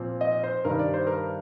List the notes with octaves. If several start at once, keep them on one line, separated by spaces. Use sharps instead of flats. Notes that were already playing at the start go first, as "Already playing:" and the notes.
Already playing: A#2 F3 C4 F4
D#5
C5
G2 D#3 G3 A#4
D5
C5
A#4